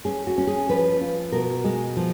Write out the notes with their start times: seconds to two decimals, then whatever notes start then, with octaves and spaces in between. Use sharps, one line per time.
0.05 C#4 G#4
0.27 F#4
0.38 C#4
0.47 G#4
0.69 F3 B4
1.01 F4
1.32 B2 A#4
1.64 G#3
1.97 F3